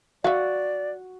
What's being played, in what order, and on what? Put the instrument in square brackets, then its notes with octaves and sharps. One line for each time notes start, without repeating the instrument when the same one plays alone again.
[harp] F#4 [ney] D5 [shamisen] E5 F5